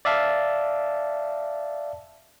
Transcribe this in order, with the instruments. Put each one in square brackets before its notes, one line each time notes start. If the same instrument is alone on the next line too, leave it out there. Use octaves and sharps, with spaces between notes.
[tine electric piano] D5 E5 F5 A5